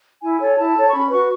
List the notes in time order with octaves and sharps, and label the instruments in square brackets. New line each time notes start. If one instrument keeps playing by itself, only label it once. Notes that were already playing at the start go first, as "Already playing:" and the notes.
[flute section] E4 G#5
A4 C#5
E4 A5
A4 C#5
C#6
C#4 B5
F#4 B4 C#6